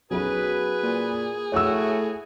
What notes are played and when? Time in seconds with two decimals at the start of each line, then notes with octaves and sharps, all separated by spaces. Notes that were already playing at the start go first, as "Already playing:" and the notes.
0.11 B1 F#3 C#4 F#4 G#4 B4
0.83 A#2
1.52 A2 A3 F#4 C#5 F#5 E6